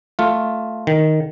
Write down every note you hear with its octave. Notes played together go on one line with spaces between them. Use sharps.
A3 F4
D#3